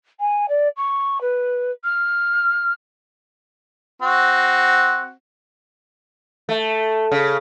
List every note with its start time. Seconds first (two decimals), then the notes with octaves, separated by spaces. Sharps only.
0.20 G#5
0.48 D5
0.76 C#6
1.21 B4
1.84 F6
4.02 C4 F#4
6.49 A3
7.12 C#3